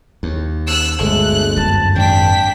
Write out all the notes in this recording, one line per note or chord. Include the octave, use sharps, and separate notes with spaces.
D#2
E6 F#6
G1 D2 G#3 A3 F#6
F#2 A5
G#1 D4 G5 B6